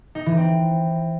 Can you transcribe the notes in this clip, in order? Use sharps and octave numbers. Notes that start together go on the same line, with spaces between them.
D#4
E3
C4